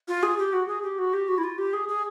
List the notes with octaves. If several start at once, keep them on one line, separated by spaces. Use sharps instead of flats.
F4
G#4
G4
F#4
G#4
G4
F#4
G4
F#4
E4
F4
G4
G#4
G#4